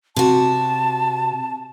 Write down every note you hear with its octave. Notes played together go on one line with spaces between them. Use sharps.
C3 F#4 A5